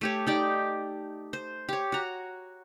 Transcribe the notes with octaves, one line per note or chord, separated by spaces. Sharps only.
A3 G4 C#5
D#4 G4 D5
C5
G4 C#5
F#4 A#5